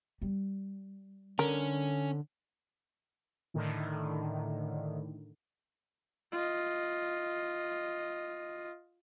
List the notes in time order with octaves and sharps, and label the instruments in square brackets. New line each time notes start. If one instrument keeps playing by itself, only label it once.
[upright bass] G3
[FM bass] D3 [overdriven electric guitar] C#4 [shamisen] A#4
[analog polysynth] A2 D3 D#3
[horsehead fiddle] F4 D#5